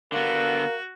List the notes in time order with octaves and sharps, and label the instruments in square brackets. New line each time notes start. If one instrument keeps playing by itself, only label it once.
[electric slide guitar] D3 B3 [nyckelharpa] F#4 [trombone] A#4 [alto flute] F5